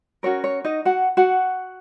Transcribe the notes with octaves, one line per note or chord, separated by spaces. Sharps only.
C#4 F#4 A#4 C#5
C#5
D#4 D#5
F#4 F#5
F#4 F#5